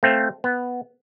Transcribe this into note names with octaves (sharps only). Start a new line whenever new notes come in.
A3 C4 F5
B3